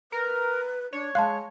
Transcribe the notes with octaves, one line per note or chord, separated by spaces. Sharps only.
A#4 B4
D4 C#5
G#3 F5 A5 C6 F#6